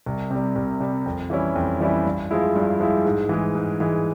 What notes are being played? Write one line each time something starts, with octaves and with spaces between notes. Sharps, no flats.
C2
C3 G3
C2
C3 G3
F2
E3 G3 C#4 E4
F2
E3 G3 C#4 E4
G2
F3 G#3 E4
G2
F3 G#3 E4
G#2
E3 G#3
G#2
E3 G#3